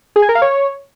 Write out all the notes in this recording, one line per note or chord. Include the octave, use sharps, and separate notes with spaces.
G#4
G#5
A#4
F5
C#5